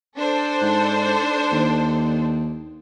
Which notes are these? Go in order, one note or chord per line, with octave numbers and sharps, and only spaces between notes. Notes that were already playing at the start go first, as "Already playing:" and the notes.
D4 A4 C5
G#2
D#2